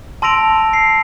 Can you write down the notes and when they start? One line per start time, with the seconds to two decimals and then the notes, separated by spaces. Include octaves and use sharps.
0.22 A5 C6 E6 A#6 D7 F7
0.73 C7